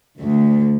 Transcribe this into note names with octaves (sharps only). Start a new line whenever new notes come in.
D2